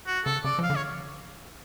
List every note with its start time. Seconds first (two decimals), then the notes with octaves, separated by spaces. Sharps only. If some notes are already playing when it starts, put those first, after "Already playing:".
0.07 F#4
0.25 C#3 A4
0.44 C#3 D5
0.59 F3 F5
0.70 D3
0.75 C#5